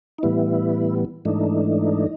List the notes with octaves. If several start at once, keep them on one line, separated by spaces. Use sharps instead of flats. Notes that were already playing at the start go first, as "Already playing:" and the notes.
D#4
A2 E3 G3 B3 E4
G#2 E3 A3 D4 D#4